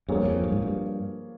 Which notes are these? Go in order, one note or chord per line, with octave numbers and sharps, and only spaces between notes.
G2 F3 A#3 F4 G#4 C#5
F2
G2
G#2
G2